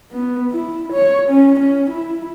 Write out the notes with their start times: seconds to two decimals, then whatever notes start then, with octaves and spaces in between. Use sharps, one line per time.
0.12 B3
0.52 E4
0.93 C#5
1.30 C#4
1.60 C#4
1.90 E4